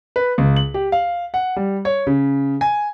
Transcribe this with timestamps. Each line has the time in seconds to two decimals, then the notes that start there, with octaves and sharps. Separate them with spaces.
0.16 B4
0.38 C#2
0.57 F#7
0.74 G4
0.92 F5
1.34 F#5
1.56 G3
1.85 C#5
2.07 C#3
2.61 G#5